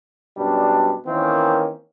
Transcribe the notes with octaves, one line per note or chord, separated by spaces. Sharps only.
F#2 B2 G3 D4
D#3 E3 A#3 C4 C#4